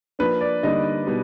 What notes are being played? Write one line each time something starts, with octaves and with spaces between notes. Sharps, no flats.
F3 A#3 D4 B4
D5
D3 G3 A#3 D#4 D#5
B2 G3 B3